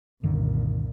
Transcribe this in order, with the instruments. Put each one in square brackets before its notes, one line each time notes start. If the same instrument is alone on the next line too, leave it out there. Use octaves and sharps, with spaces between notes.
[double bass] C2 A#2 [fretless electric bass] F#2 D3 D#3